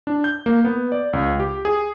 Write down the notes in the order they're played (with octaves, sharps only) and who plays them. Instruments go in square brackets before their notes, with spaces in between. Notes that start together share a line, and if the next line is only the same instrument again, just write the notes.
[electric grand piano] D4
G6
A#3
B3
D5
C#2
G4
G#4